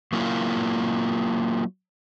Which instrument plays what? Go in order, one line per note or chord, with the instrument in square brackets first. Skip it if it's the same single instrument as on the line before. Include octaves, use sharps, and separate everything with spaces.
[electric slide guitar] F#3 A#3 E4 F4